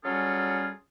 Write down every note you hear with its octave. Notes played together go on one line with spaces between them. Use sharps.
F#3 G3 C#4 F4 G#4 A4